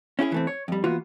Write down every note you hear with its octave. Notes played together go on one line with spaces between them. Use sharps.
C#4 E4 G4 G#4
E3 A3 C4
C#5
F2 G3
E3 A#3 B3 F4 F#4